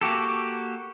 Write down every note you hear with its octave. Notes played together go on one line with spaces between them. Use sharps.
A#3 F#4 G4 A4